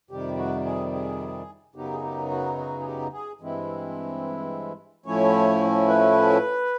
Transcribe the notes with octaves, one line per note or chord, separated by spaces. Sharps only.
F2 C3 D#3 G3 G4
F#4
G#4
G#4
F#2 C#3 F#3 B3 D#4 G4
G#4
G4
F#4
F#4
G#4
G4
G#4
G2 E3 G#3 C4 E4
A2 F3 A3 C#4 E4 C#5
B4